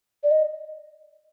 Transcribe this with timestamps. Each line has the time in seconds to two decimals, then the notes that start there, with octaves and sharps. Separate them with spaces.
0.23 D5
0.31 D#5